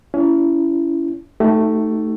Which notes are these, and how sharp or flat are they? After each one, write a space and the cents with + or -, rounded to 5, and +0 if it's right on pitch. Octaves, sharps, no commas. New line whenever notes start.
A#3 +0 C#4 +35 E4 +25
A3 +10 D#4 +0 G4 -40